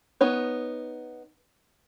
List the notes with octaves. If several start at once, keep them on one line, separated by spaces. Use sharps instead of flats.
B3 D#4 C#5